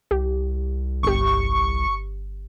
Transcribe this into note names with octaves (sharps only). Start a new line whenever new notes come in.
C2 G4
G1 G4 C#6